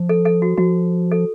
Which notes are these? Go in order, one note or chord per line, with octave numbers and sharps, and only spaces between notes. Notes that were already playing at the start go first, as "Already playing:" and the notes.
Already playing: F3
A4
A4
F#4
F3 F#4
A4